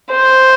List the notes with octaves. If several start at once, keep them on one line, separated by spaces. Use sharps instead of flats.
C5